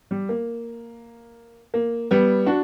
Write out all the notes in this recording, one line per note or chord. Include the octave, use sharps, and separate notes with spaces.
G3
A#3
A#3
G3 B3
D4 F#4